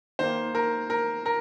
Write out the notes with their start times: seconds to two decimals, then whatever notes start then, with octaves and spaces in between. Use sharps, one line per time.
0.19 D#3 A#3 C5
0.55 A#4
0.90 A#4
1.26 A#4